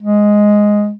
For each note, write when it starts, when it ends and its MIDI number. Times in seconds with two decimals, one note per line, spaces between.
0.03 0.93 56